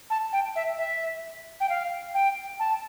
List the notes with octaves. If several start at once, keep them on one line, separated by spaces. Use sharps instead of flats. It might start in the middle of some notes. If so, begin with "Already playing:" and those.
A5
G5
E5
E5
G5
F5
G5
A5